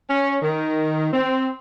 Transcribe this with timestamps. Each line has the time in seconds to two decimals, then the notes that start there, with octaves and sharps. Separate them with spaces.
0.08 C#4
0.42 D#3
1.13 C4